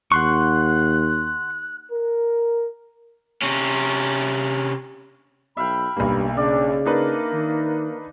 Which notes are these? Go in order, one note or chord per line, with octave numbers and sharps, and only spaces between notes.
D#2 F#5 C6 C#6 F#6
A#4
C3 C#4
B1 E5 F5 G5 B5
B1 G2 A#3
C#3 D4 D5
A#3 D4 D#4 B4
D#3